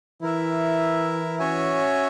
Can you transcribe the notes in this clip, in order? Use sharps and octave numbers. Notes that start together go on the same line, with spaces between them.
E3 E4 A#4 E5
C#4 F#4 C#5 E5 G#5